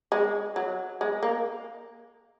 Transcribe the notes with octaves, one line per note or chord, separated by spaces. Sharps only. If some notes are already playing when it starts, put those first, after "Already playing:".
G#3
F#3
G#3
A#3